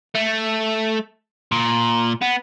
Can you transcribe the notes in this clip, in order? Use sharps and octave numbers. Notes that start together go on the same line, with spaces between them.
A3
A#2
B3